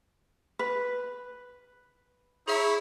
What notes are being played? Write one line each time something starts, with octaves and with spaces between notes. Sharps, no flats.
B4
E4 G#4 C#5 E5 A#5